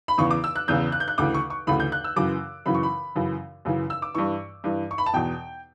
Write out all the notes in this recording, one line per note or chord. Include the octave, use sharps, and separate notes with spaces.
B5
E2 C#3 E3 C#6
D6
E6
F#6
E2 C#3 E3 G6
F#6
G6
F#6
D2 C#3 E3 D6
C#6
C#6
D2 C#3 E3 B5
G6
F#6
E6
F#2 C#3 E3 D6
F#2 C#3 E3 B5
C#6
B5
F#2 C#3 E3
F#2 C#3 E3
E6
D6
G2 E3 C#6
G2 E3
C#6
B5
A5
E2 B2 G5